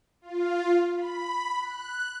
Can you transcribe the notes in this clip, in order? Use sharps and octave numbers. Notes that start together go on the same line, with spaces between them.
F4
B5
F#6